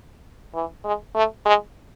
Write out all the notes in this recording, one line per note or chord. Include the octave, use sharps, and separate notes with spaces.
E3
G#3
A3
G#3